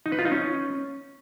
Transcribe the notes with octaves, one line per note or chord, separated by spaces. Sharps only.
D#4
B4
F4
D#4
C#4